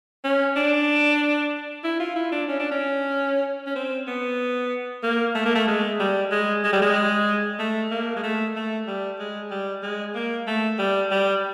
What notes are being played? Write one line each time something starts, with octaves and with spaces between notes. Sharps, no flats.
C#4
D4
E4
F4
E4
D4
C#4
D4
C#4
C#4
C4
B3
A#3
A3
A#3
A3
G#3
G3
G#3
G#3
G3
G#3
A3
A#3
G#3
A3
A3
G3
G#3
G3
G#3
A#3
A3
G3
G3